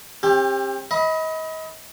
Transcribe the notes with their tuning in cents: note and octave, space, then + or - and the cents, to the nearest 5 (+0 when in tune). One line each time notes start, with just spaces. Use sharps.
C4 +45 G4 +20
D#5 +35 B5 -5